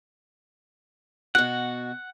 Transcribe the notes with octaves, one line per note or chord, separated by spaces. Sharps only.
B2 F#4 F#5 F#6